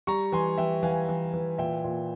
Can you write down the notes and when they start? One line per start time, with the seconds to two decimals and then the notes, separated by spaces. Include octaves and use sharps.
0.07 G3 A#5 C#6
0.32 E3 G#5 C6
0.58 E3 E5 G5
0.83 E3 F5 G#5
1.09 E3
1.34 E3
1.58 A#2 E5 G5
1.84 A#2